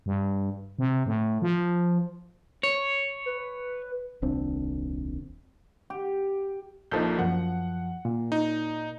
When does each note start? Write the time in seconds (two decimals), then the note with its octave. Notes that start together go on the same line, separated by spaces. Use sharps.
0.06 G2
0.79 C3
1.06 A2
1.42 F3
2.63 C#5
3.26 B4
4.22 D#1 C2 C4 D4
5.90 G4
6.91 A#1 F3 A#3 D#4 A4 G6
7.19 F#2 F3 F#5
8.05 A#2
8.32 D#4